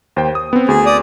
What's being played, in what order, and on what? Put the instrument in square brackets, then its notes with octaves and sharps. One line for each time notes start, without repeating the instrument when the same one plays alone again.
[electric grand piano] D#2 C5 G5
D#6
B3 C4
[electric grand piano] D2 [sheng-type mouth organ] G#4
[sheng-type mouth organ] D5 D#6